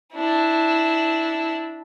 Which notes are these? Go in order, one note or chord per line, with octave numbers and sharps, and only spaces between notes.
D4 E4